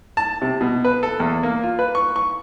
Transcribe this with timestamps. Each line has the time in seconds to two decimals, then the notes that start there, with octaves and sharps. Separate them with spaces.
0.17 A5
0.42 C3
0.61 B2
0.85 B4
1.03 A4
1.20 E2
1.43 A#3
1.63 F4
1.79 B4
1.95 C#6
2.16 C#6